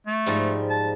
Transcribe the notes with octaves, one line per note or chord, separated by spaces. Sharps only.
A3
G#2 F3 G3
A5